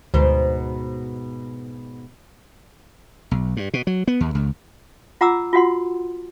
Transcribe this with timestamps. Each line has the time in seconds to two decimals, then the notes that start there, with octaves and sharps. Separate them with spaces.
0.14 D2 G#2 B2 C5
3.31 B1
3.57 G2
3.74 B2
3.87 F#3
4.08 B3
4.20 D#2
4.35 C#2
5.21 F4 F#5 A#5 D6 E6
5.53 F4 F#4 F#5 C6